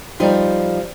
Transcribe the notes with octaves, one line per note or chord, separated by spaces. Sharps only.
F3 G3 D#4